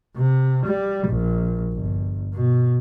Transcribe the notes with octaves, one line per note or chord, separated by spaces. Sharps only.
C3
G3
A#1
G1
B2